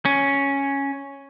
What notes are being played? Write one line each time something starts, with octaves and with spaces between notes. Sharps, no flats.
C#4